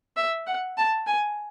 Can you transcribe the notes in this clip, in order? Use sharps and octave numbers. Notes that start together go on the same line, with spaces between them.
E5
F#5
A5
G#5